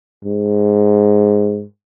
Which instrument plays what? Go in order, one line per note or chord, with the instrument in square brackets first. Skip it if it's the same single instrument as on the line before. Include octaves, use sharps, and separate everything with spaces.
[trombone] G#2